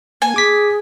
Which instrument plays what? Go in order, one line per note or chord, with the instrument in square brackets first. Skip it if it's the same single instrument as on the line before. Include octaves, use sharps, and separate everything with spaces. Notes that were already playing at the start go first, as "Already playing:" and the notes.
[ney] A#3 [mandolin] G#5
[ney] G#4 [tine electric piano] D6 B6